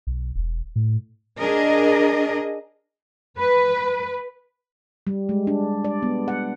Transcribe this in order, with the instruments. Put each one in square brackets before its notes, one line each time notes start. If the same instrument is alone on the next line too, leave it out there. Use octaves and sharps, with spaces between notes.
[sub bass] B1
E1
A2
[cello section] D4 G#4 A#4 D#5
B4
[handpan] G3
G#3
D4
D5
B3
F#5